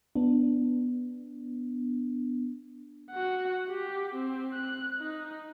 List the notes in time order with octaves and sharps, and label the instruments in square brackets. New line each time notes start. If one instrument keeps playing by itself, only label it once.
[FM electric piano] B3 D4
[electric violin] F#4 F#5
G4
C4
F#6
D#4